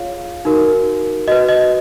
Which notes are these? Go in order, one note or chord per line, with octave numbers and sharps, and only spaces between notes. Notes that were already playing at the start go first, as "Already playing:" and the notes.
Already playing: F4 G#4 C#5 F5
D#4 F#4 A#4
F#4 B4 D#5
D#5
D#5